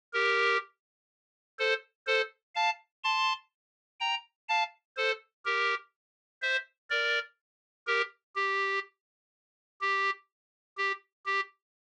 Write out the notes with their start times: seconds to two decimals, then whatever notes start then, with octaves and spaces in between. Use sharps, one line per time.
0.13 G4 A#4
1.59 A4 C5
2.07 A4 C5
2.55 F5 A5
3.04 A5 C6
4.00 G5 A#5
4.49 F5 A5
4.97 A4 C5
5.45 G4 A#4
6.42 C5 E5
6.90 A#4 D5
7.87 G4 A#4
8.36 G4
9.81 G4
10.78 G4
11.26 G4